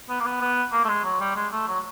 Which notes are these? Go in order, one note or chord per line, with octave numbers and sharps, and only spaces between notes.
B3
A#3
B3
B3
A#3
A3
G#3
F#3
G3
G#3
A3
F#3